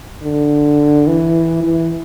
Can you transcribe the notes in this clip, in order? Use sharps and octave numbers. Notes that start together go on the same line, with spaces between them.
D3
E3
E3